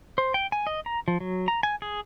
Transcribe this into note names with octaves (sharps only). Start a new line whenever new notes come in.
C5
G5
G#5
D#5
A#5
F3
F#3
A#5
G#5
G#4